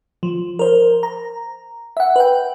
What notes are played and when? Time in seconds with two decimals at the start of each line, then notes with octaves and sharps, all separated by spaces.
0.23 F3
0.59 A#4 C5
1.03 A#5
1.97 E5 F#5
2.16 B4 G5